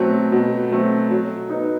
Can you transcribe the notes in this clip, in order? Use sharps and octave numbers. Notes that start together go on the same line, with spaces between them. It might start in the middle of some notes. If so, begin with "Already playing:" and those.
Already playing: B2 F#3 A3 C4
B2
F#3 A3 C4
F#3
B3 D#4